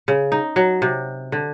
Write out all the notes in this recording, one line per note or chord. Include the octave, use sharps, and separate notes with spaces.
C#3
D#4
F#3
C3
D3